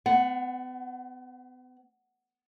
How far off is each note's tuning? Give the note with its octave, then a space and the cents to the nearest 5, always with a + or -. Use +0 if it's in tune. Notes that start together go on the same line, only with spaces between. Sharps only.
B3 +40 F#5 +0